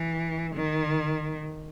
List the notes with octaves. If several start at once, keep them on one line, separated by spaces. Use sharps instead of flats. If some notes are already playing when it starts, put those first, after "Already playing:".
Already playing: E3
D#3